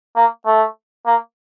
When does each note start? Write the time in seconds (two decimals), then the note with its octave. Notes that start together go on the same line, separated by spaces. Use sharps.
0.16 A#3
0.46 A3
1.06 A#3